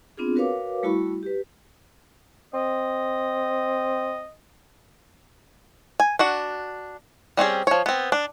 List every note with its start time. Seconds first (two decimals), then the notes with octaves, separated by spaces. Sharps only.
0.17 B3 C4 D4 F4 G#4
0.35 F#4 A#4 B4 C#5 F5 D6
0.83 G3 A3 E4 F#4 B5 C#6
1.23 G4 B4
2.54 C4 D#5
6.00 G#5
6.19 D4 F#4 F#5
7.37 G3 C4 C#4 G#4
7.67 F3 C#5
7.86 B3 C4
8.12 D4